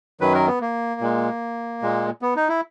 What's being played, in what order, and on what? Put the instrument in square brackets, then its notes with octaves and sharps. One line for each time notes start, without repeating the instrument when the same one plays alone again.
[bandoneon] F#2 D#3 F#3 B4
A#4
B3
A#3
A#2 G#3
A#2 G#3
B3
D#4
E4